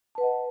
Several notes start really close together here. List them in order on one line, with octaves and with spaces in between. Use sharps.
A5 B4 F#5 D#5